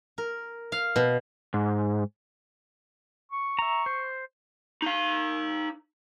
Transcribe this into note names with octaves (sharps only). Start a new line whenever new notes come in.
A#4
F5
B2
G#2
C#6
E5 A#5
C5
D#4 F5